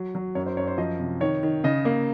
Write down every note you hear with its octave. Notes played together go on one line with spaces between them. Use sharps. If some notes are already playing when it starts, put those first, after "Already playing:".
Already playing: F#3
F#3
F#2 C#5
C5
F#2 C#5
C5
F3 D#5
C3
D#3 C#5
D#3
C#3 D#5
A#3